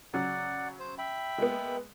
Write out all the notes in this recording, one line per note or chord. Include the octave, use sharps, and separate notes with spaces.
C#3 F#3 C#4 D5 F#5
C5
E5 G5 B5
G#3 A#3 B3